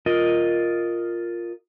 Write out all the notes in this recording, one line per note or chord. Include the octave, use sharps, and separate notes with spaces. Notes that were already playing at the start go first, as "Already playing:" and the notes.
F4 A#4 D#5